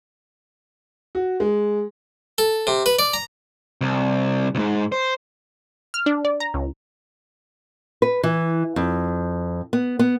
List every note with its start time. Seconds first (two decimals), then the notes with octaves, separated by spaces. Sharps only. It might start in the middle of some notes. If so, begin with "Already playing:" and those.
1.15 F#4
1.40 G#3
2.38 A4
2.67 C3
2.86 B4
2.99 D5
3.14 A#5
3.81 C2
4.55 C2 G#2
4.92 C5
5.94 F6
6.06 D4
6.25 D5
6.40 A#5
6.54 C#2
8.02 B4
8.23 E3
8.76 F2
9.73 B3
9.99 B3